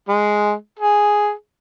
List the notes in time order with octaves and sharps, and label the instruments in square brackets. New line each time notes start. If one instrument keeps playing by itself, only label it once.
[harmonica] G#3
G#4